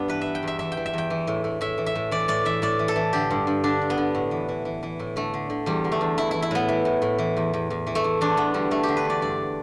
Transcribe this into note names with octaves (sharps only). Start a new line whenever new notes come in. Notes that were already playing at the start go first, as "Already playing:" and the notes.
Already playing: G2 B3 D4
E3 B4
E3 E5
G5
E2 E5
E3 E5
G5
E3
E5
E2 G5
E3
A2
A2
A2 E5
E3
E5
A2
E3 D5
A2 D5
E3 E5
A2 D5
E3
A4
E3
D3 G4
G2
G2
D3 D4
G2
B3
D3
A2
E3
E3
E3
E3
A2
D3 A3
D3
D3
E2 G3
D3
A3
E2
E3 E4
E3 E4
E4
A2 B3
E3
A2
A2
E3
E2
E2
E2
E3
A3
E3
E2 D4
E2 B3
D3 G3
D3 A3
G4
D3
B4
E2 D5
G2 D5